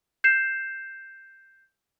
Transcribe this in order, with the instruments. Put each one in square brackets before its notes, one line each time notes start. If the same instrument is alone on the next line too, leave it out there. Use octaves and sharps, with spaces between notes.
[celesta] G6 C7 E7